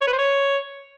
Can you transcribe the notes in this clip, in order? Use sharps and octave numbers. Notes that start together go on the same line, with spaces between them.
C#5
B4
C5
C#5